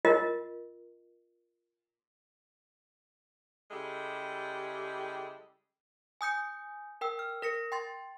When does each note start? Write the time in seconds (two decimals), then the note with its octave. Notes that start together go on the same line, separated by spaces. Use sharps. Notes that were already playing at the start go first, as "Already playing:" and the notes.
0.05 F4 A#4 D#5
3.71 C#3 G3 G#3 E4 G4 A4
6.21 G#5 D#6 G6 C#7
7.01 A#4 G5 E6
7.19 F6
7.42 A#4 A#6 C#7
7.72 G5 C6 A6